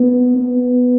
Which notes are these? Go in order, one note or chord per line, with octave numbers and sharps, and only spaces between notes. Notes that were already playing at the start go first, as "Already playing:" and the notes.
Already playing: B3
B3